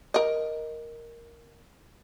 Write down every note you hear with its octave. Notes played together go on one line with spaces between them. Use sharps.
A#4 D#5